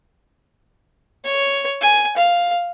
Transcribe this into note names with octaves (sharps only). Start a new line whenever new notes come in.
C#5
G#5
F5